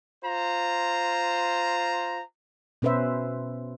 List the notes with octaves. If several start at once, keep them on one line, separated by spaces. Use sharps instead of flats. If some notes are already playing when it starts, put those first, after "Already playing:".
F4 C5 A#5
B2 C#4 B4 C5 E5